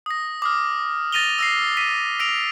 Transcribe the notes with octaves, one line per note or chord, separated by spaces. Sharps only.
D#6 A#6
D6 D#6 F6
A6 A#6 D#7 F7 G7
E6 A#6 C7
B6 D#7
E6 A#6 D7 F7